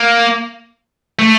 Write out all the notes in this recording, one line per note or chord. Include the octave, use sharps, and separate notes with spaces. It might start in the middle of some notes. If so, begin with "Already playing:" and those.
Already playing: A#3
A3